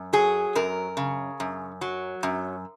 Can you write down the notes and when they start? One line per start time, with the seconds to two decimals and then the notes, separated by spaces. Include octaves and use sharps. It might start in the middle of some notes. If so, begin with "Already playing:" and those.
Already playing: F#2
0.13 F#3 G#4
0.55 F#2 A#4
0.97 C#3
1.40 F#2
1.81 F#3
2.23 F#2